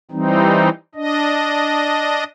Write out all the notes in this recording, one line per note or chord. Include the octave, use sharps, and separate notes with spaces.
E3 G3 C4 D#4
D4 D#5